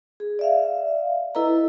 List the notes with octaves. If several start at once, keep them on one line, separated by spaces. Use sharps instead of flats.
G#4
D5 E5 F5
E4 A4 B4 D#5 A#5